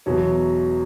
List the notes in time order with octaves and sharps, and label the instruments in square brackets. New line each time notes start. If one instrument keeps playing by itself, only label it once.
[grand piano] E1 E2 B2 F#3 C#5